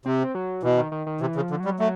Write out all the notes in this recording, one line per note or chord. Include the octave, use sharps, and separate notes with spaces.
C3 C4
F#3
B2 E3
D#3
D#3
D#3
C3 E3
C#3
F3
D3
F#3 G3
F#3 A3